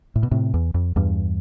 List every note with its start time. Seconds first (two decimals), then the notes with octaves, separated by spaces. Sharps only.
0.16 A2
0.23 B2
0.31 A2 C3
0.54 E2
0.74 F2
0.96 E2 G2